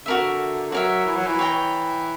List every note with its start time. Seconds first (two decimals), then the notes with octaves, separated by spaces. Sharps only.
0.06 D3 F#4 A#4 E5
0.72 F#3 F#4 A#4 E5
1.06 E3
1.17 F#3
1.27 E3
1.39 C#5 G5 A#5